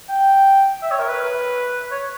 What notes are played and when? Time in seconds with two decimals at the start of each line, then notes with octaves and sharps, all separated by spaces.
0.09 G5
0.82 E5
0.91 C#5
1.00 A#4
1.09 B4
1.91 C#5